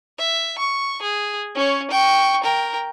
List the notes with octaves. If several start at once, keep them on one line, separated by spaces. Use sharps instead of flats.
E5
C#6
G#4
C#4 C#5
G5 C#6
A#4 G5